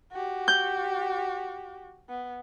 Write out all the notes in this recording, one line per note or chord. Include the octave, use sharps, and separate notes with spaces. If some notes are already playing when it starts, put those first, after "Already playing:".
F#4 G4
G6
B3